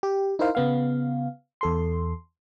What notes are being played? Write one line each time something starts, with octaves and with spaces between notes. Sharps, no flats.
G4
D#4 E4 A#4 C5 F5
C#3 B3 F5
E2 A4 C6